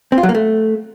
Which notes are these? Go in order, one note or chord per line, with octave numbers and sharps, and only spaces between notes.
C4
F4
F#3
A#3
A3